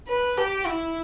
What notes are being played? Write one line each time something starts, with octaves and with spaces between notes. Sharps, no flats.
B4
G4
E4